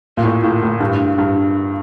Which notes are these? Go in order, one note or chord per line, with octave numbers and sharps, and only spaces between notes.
A#2
A2
A2
A2
G2
G2